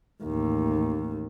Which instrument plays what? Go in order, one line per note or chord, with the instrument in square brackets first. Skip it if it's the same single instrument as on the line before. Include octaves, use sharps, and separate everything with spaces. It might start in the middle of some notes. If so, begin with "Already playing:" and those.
[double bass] A1 D#2